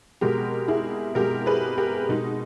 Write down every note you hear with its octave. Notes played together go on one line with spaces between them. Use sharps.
B2 G#3 G4 A#4
E4 G#4
B2 G#3 G4 A#4
G#4 B4
G4 A#4
B2 G#3 D#4